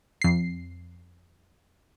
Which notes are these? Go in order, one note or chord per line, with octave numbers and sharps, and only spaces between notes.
F2 C7